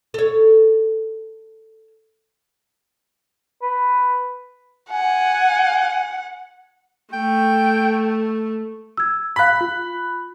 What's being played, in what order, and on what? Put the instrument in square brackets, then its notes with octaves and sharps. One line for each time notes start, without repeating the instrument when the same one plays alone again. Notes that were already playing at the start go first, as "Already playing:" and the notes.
[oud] A4 C#5
[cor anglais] B4
[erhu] F#5 [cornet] G#5
[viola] A3 [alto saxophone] G5
[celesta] E6 G#6
[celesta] F5 B6 [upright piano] B5 F#6
[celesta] F4